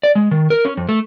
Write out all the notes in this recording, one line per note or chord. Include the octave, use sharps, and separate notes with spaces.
D5
G#3
D#3
A#4
C#4
F2
A3